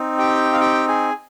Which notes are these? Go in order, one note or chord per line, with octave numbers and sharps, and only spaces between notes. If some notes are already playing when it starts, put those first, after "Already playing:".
Already playing: C4 D#4
G4 G5
F5
G4 G5
G#4 G#5